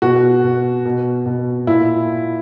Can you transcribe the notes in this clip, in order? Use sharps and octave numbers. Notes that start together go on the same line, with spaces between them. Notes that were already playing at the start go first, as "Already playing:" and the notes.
B2 F#4
B2
B2
B2
A#2 E4